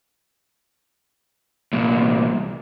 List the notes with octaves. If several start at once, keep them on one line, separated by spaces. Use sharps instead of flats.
C2 A#2